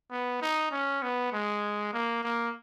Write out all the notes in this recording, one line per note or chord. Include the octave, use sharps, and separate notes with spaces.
B3
D#4
C#4
B3
G#3
A#3
A#3